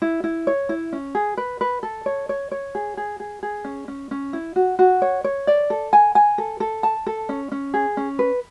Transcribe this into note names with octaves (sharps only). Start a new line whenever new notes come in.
E4
E4
C#5
E4
C#4
G#4
B4
B4
A4
C#5
C#5
C#5
G#4
G#4
G#4
G#4
C#4
C#4
C#4
E4
F#4
F#4
C#5
C#5
D5
A4
G#5
G#5
A4
A4
A5
A4
C#4
C#4
G#4
C#4
B4